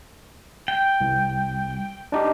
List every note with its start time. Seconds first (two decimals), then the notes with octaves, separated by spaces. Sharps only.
0.68 G5
1.01 C2
2.12 D4 D#4 G4